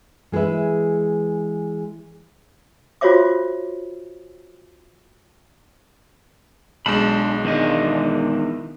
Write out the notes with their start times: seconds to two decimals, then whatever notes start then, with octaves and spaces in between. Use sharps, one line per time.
0.32 E3 G#3 G#4 B4 E5
3.01 F4 F#4 C5 C#5 E5 D6
6.86 B1 G#3 D4 A5 B5
7.45 E2 D#3 D4 D#5